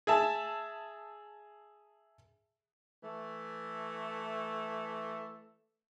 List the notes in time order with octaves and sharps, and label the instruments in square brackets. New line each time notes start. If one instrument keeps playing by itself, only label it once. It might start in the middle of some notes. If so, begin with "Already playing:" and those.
[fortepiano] G#4 E5 A5
[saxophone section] E3 A3